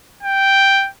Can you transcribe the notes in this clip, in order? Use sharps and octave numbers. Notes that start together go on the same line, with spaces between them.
G5